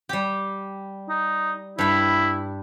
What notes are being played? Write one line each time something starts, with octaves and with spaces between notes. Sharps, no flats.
G3 G4
D#4
G2 E4 B5